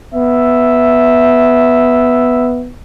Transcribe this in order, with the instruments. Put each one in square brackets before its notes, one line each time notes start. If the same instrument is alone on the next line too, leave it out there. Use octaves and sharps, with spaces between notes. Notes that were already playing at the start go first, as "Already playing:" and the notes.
[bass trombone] B3 [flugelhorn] E5